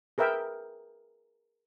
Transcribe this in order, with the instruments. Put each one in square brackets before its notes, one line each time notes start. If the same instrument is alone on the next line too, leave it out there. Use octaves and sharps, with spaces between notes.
[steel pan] G#4 A#4 B4 E5 G5